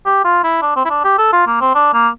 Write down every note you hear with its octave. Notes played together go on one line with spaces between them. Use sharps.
G4
F4
E4
D4
C4
E4
D4
G4
A4
F4
A#3
C4
D4
A#3